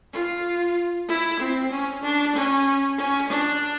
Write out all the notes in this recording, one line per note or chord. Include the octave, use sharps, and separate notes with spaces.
F4
E4
C4
C#4
D4
C#4
C#4
D4